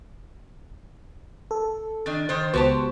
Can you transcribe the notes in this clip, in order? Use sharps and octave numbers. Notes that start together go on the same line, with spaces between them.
A4
D#3 D4 A6
D#3 C5
C#2 B3 F#4 G4 C5 A5